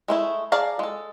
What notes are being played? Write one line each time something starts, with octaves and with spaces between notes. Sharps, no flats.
G#3 A3 E4
G#4 D5 F5 A5 A#5
G#3 A4